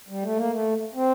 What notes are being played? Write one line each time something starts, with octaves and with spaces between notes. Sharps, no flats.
G3
A3
A#3
A3
C4